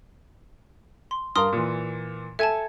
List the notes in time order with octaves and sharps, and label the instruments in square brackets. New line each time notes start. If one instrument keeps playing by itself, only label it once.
[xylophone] C6
[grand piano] G2 A#4 F5 [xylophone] C6 D#6 F6
[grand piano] A#2 E3
[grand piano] A4 G#6 [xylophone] E5 G#5 A5